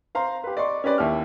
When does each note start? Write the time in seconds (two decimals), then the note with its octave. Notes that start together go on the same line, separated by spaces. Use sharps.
0.15 C5 F5 A#5 C6
0.44 G4 B4
0.57 D5 D#5 C6 C#6
0.84 C#4 G4 B4 D5
0.98 D#2 E4 G4 F6